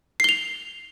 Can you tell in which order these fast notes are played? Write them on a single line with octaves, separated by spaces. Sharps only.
C7 G7 F7